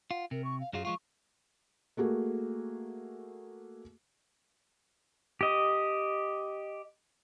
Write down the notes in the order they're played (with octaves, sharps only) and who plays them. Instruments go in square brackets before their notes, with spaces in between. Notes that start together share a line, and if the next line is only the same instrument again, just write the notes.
[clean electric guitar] F4 [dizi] F#5
[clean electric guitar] C3 [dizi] A#4
[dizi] C#6
F5
[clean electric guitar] F#2 F#3 F4 [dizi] G#4
[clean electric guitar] F3 G#3 F4 [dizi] C#6
[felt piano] A3 A#3 F#4 G#4
[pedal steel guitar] G4 D#5